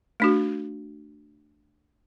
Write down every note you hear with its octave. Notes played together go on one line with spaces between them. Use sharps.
A3 D4 F#4